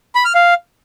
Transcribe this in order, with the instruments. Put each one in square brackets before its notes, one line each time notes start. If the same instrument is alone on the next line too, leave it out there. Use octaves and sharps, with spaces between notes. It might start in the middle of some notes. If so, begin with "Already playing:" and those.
[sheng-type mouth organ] B5
F6
F5